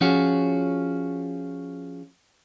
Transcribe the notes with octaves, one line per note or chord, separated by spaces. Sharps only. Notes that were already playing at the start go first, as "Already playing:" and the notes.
F3 C#4 F4 F#4 G#4 C#5